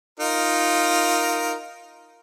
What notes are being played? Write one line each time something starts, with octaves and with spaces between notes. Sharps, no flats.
D#4 F4 A#4